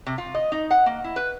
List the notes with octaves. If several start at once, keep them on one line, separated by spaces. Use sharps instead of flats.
C3
F4
D#5
D#4
F#5
A#3
E4
B4